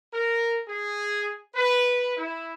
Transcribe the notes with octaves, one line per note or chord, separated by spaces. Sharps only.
A#4
G#4
B4
E4